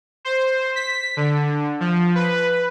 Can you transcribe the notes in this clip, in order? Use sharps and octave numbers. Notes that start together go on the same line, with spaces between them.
C5
B6
D3
F3
B4